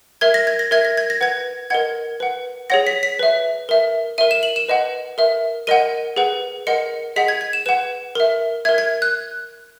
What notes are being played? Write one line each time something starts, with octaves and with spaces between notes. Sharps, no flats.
A#4 E5 G#6
A#6
G#6
A#6
A#4 E5 G#6
A#6
G#6
A#6
B4 F#5 G#6
A#4 D#5 F#5 G#6
B4 F#5
G#4 C#5 F#5 A#6
B6
B6
B4 E5
A#4 E5
A#4 E5 D#7
E7
F#7
E7
B4 D#5 F#5
A#4 E5
A#4 D#5 F#5 D#7
G#4 B4 F#5
A#4 D#5 F#5 C#7
G#4 D#5 F#5 B6
G#6
G#6
E7
B4 F#5 E7
A#4 E5
A#4 E5 G#6
G#6
F#6